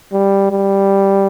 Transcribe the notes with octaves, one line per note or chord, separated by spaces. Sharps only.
G3
G3